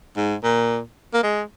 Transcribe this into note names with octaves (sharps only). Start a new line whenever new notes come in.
G#2
A#2
A#3
G#3